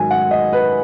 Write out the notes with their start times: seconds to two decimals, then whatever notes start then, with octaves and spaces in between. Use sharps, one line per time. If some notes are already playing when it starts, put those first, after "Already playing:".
Already playing: G#2 D#3 F#3 G#5
0.11 F#5
0.31 D#5
0.53 B4